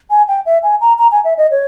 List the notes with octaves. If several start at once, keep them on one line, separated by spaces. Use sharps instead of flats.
G#5
G5
E5
G#5
A#5
A#5
G#5
E5
D#5
C#5